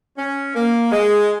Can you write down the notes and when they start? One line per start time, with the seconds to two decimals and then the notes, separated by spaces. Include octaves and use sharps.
0.17 C#4
0.54 A#3
0.91 G#3